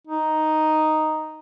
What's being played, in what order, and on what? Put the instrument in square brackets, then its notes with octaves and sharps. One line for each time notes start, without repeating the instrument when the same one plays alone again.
[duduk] D#4